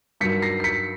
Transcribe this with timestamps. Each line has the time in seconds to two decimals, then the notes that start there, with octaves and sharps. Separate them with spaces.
0.21 G2 D#3 F#3 B6 C#7
0.42 A#6 C7
0.60 C7
0.64 B6 C#7